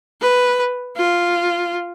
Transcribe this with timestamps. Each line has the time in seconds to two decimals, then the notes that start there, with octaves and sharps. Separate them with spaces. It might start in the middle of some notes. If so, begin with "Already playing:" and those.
0.21 B4
0.96 F4